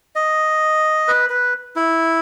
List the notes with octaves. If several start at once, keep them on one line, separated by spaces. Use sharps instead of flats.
D#5
B4
B4
E4